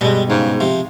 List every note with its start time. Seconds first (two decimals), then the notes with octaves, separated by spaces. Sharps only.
0.01 G2 B2 G3 G#3
0.30 G#2 C#3
0.60 C3 F3